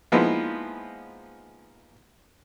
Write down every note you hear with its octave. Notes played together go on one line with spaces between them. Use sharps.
F3 G#3 A#3 B3 D#4 E4